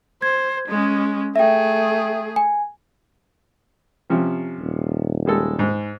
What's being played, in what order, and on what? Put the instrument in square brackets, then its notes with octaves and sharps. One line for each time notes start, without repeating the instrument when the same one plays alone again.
[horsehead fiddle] C5 [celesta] G#6
[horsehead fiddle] G#3 C#4
[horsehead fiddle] A3 G#4 [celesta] E5 G5
[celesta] G#5
[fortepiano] C3 F3 C#4
[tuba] D#1
[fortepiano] G3 G#3 A4
G#2